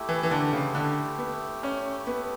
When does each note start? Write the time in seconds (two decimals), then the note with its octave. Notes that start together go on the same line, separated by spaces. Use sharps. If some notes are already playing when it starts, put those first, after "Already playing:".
Already playing: A3 E4 G4
0.09 E3
0.23 E3
0.31 D3
0.53 C#3
0.75 D3
1.18 B3
1.63 C#4
2.07 B3